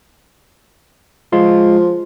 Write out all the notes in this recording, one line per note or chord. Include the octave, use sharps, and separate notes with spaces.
F3 G#3 F4 C6